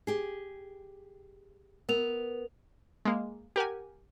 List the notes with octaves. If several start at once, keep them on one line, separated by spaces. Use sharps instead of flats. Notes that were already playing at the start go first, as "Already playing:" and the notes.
G4 G#4
B3 A#4 F7
G#3 A#3
G4 A#4 F#5 G#5